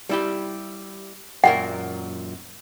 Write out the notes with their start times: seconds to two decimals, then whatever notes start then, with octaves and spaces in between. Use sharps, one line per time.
0.09 G3 E4 G4
1.44 F#2 A#2 A#4 F#5